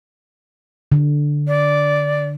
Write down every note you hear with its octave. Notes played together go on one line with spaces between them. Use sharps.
D3
D5